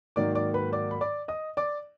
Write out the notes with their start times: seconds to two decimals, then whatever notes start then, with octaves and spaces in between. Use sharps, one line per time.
0.16 G#2 D#3 F#3 A#3 D5 D6
0.35 D5 D6
0.54 B4 B5
0.73 D5 D6
0.91 B5
1.01 D5 D6
1.28 D#5 D#6
1.57 D5 D6